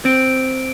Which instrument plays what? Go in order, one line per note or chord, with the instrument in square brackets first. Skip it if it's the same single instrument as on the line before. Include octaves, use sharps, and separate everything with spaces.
[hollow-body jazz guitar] C4 [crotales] D7